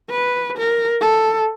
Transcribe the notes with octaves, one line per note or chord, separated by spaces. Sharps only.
B4
A#4
A4